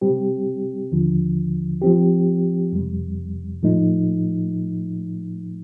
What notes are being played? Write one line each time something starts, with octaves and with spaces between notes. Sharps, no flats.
C3 G3 C4 G4
D#2 D3 F3
F3 C4 G4
F2 C3 G3
A2 F3 A3 D#4